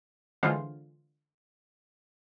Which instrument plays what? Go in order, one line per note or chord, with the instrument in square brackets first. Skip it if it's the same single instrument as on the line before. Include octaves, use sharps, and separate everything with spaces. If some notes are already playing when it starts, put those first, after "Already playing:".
[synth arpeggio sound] D3 E3 G#3 F4 C5